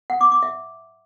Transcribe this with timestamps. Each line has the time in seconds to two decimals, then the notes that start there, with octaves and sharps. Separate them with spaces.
0.10 F#5
0.21 D6
0.32 D6
0.43 E5